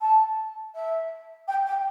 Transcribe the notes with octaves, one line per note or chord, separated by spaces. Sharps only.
A5
E5
G5
G5